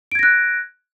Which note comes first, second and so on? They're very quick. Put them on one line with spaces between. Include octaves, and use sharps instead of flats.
D7 G#6 A#6 F#6